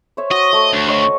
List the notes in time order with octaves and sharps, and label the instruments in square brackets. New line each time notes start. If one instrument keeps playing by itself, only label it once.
[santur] C5 C#5 E5
[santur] F#4 [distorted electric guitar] D#5
[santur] A3
[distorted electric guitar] D2
[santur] C5 C#5 D#5